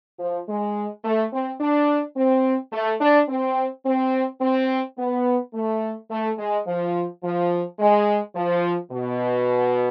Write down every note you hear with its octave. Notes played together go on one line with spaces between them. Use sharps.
F3
G#3
A3
C4
D4
C4
A3
D4
C4
C4
C4
B3
A3
A3
G#3
F3
F3
G#3
F3
B2